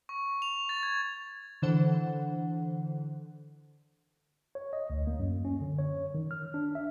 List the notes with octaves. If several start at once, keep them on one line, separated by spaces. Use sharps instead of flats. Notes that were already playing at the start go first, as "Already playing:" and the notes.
C#6
F7
A6
G#6
D3 E3 D4 A4 C5 F#5
C#5
D#5
D2
A#3
F#2
C#4
D3
C#5
D#3
F6
D4
E5